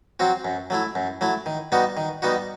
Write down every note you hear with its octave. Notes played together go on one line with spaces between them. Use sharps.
F#3 C4 F#4
F#2
F#3 A3 E4
F#2
F#3 A3 E4
D#3
G3 B3 D#4 F#4
D#3
G3 B3 D#4 F#4